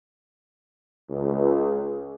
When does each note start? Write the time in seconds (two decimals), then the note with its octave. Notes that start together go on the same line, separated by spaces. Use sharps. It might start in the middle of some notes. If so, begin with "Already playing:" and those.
1.10 C#2